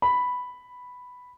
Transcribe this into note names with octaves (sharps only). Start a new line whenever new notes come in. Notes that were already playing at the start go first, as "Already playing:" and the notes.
B5